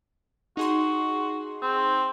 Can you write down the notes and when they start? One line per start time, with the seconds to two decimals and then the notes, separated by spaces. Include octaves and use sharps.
0.57 D#4 F#4 G#4 C6
1.62 C4